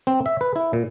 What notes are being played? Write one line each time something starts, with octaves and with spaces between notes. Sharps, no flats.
C4
E5
B4
E4
A#2